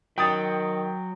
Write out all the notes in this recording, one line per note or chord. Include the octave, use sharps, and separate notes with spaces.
D#3 F#3 G5 D#6 A6